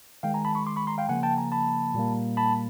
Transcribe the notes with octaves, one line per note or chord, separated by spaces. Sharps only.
D#3 G#3 F5 G5
G#5 A#5
A5 B5
B5 C#6
C6 D6
B5 C#6
A#5 C6
F5 G5
C#3 F3 A#3 F#5 G#5
G5 A5
G#5 A#5
A5 B5
A#2 G3 A#3
A5 B5